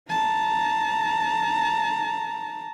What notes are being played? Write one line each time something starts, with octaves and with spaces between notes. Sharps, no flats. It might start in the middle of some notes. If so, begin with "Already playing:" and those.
A5 A#5